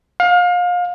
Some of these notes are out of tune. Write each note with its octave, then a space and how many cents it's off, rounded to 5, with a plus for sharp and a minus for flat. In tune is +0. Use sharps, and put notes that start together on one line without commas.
F5 +30